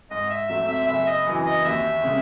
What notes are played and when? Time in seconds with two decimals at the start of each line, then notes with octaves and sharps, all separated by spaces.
0.11 G#2 D#5
0.30 E5
0.49 F#3 A3 C4 E5
0.68 E5
0.88 F#1 E5
1.07 D#5
1.26 F#2 E3
1.46 D#5
1.65 D#2 E5
2.04 C#3 G#3